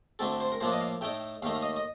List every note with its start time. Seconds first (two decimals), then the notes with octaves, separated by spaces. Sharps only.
0.19 D2 D3 A3 C4 A4
0.40 C5
0.52 A#4
0.61 A2 F3 A#3 D4 C5
0.72 D#5
0.81 F5
1.01 A2 A3 D#4 G5
1.42 D#2 D#3 A3 D#4 F5
1.55 F5
1.63 D#5
1.76 D#5